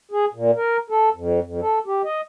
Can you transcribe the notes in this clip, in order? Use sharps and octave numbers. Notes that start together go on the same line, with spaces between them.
G#4
A#2
A#4
A4
F2
F2
A4
G4
D#5